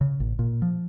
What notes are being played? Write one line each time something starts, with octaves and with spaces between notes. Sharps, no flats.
C#3
A1
A#2
F3